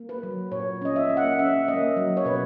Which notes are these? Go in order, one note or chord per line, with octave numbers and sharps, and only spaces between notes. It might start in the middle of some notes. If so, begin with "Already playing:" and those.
Already playing: A#3
B4
F#3
A#2 C#5
C#4 D#5
E5
A#3
F#5
C#4 E5
A#3 D#5
F#3
C#5
B2 B4